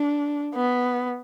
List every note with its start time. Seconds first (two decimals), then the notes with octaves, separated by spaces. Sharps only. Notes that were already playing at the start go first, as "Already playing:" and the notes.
Already playing: D4
0.55 B3